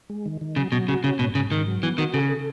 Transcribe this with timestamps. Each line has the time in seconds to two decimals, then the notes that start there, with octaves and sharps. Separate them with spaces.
0.10 G#3
0.26 D#3
0.41 D#3
0.56 C#3 F#3
0.72 B2 F#3
0.88 C#3 F#4
1.03 C#3 C#4
1.19 G#2 B2
1.35 G#2 C#3
1.52 G#2 D#3
1.66 F#3
1.83 E3 B3
1.98 D#3 F#4
2.14 C#3 A4
2.29 A4